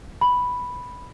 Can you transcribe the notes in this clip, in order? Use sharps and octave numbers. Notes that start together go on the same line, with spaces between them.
B5